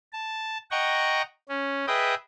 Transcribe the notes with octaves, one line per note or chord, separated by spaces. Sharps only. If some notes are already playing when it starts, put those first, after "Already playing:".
A5
D#5 F#5 G5 A#5 C#6
C#4
G#4 B4 D#5 E5 G5 D#6